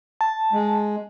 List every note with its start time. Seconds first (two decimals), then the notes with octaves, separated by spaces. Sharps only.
0.21 A5
0.53 G#3